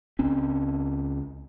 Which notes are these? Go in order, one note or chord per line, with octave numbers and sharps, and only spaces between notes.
C#2 C4 C#4